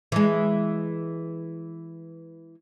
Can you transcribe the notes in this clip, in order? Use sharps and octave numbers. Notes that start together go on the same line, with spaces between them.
E3 G#3